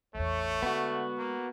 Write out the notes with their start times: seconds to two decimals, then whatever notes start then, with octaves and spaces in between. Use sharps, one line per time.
0.15 A1 E2 A3 C#5
0.62 D3 G#3 B3 F#4
1.18 A#3